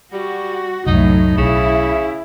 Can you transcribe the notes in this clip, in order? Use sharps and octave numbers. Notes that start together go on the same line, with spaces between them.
G3 F#4
C2 F#2 A2 F#3 D#4
B1 C#3 E4